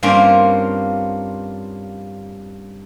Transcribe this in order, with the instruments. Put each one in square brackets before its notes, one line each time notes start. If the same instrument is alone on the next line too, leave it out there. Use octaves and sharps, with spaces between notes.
[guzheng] G2 A#3 C4 C#4 F4